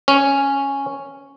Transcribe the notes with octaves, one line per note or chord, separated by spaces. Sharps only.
C#4